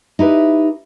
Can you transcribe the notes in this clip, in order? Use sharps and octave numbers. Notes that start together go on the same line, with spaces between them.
D#4 E4 G4 B4